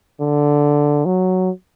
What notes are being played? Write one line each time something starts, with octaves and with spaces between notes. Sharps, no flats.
D3
F#3